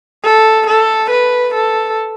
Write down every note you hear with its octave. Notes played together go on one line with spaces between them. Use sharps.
A4
A4
B4
A4